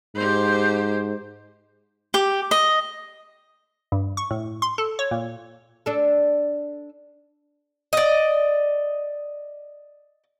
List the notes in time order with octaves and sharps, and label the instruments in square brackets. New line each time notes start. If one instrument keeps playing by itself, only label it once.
[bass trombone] G#2 [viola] G4 C5
[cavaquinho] G4
D#5
[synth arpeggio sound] G2
C#6
A2
C6
A4
C#5
A#2
[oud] D4 A4
[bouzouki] D5 D#5